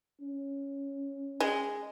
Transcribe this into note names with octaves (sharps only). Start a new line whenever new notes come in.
C#4
G#3